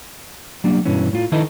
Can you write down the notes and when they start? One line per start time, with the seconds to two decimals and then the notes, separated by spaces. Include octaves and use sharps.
0.64 F#3 G3 A#3 D4
0.85 G2 B2 E3 C#4
1.13 A2 F4
1.32 D#3 D#4 E4 A4 B4 D#5